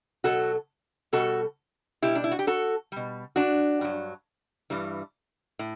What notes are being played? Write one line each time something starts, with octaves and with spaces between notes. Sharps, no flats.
B2 F#3 F#4 A4
B2 G3 F#4 A4
B2 G3 E4 G4
D4
E4
F#4
G4
F#4 A4
B2 G3
D4 F#4
G2 F#3
G2 E3 G3
A2